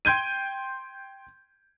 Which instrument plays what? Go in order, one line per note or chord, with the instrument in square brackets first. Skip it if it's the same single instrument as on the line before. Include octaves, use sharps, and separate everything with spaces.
[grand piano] G5 C6 G6 G#6 D#7